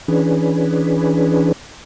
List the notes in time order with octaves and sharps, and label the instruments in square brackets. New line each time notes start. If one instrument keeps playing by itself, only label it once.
[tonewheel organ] E3 C#4 D4 G#4 B4